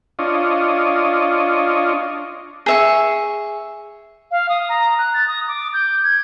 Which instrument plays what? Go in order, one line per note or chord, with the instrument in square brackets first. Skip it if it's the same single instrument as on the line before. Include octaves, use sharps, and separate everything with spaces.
[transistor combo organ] D4 F4 C#5 D#5
[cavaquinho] G#4 E5 C#6
[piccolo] F5
D#6
A#5
F#6
A6
D#6
D6
G6
G#6